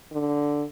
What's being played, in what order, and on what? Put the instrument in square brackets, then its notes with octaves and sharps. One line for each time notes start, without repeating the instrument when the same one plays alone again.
[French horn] D3